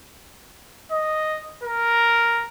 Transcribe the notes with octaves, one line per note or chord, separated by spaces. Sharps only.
D#5
A#4